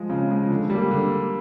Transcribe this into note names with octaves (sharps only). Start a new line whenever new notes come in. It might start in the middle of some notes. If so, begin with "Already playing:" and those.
Already playing: F3 G#3
C#3
F3 G#3
D3
G3 A#3
D3